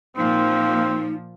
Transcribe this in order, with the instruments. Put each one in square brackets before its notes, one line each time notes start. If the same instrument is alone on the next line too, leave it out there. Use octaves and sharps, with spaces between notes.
[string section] A#2 F3 [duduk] A#3 [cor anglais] C4 [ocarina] D#4